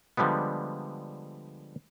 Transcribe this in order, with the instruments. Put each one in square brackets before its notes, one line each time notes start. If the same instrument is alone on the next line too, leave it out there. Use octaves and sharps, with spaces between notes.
[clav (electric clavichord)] D3 F3 G3 G#3 B3